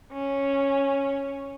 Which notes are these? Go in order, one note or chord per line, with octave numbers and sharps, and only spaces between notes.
C#4